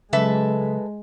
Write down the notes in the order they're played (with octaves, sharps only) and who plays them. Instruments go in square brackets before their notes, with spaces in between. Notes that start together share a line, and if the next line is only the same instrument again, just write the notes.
[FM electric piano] C#3 F#3 [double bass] G#3 [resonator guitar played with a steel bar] A4 B4 E5